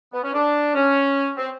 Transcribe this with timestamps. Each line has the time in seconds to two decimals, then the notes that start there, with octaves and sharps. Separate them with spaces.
0.14 B3
0.23 C#4
0.34 D4
0.75 C#4
1.37 C4